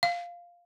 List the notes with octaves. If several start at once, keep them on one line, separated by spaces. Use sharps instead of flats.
F5